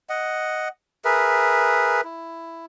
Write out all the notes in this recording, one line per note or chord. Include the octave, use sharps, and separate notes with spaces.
D#5 F#5
G#4 A#4 B4 E5
E4